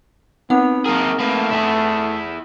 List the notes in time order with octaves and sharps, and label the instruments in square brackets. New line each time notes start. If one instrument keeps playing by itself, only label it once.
[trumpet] B3 [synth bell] C4 D#4 F#5
[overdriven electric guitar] A#3 G#4 [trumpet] A#4
[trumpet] A3 [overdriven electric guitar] A#3 B4
[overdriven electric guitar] E4 G#4